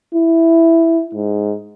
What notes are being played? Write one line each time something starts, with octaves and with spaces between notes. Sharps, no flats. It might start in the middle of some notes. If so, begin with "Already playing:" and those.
E4
G#2